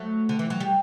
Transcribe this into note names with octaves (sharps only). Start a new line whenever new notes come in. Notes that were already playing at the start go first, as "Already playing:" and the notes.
Already playing: F#3 A3
D3
E3
F#3
G3